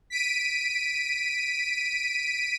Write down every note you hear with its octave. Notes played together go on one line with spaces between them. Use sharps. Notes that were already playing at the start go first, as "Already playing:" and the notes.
B6 D7 D#7